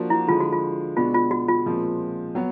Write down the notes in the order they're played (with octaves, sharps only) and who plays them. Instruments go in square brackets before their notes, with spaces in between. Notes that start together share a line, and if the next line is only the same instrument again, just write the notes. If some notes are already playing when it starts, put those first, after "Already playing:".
Already playing: [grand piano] F3 A#3 D4 F#4
[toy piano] E4
[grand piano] D3 F3 G#3 [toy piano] F4
[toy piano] F#4
F4
[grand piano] B2 G#3 B3 D4 F#4 [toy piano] F4
[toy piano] F4
F#4
F4
[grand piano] A#2 F3 G#3 C4
F#3 B3